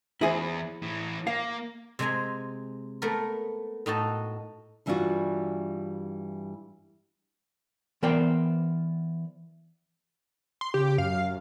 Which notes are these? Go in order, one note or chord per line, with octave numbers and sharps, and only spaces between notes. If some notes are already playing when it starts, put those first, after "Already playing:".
E2 E4 G#4 C5
A2 E3
A#3 F5
C3 G#3 C5 G#5 A#5
A3 B3 A#4
A2 D#4 F#4 A5
G2 E3 G3 D4 F4 F#4
E3 B3 A#4 C5 D5 G5
C6
C#3 G4
F#2 F5